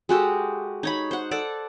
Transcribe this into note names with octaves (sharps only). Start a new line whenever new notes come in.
G#3 F#4 G4 A4
D#4 C#5 B5
C5 F#5
A4 D5 F#5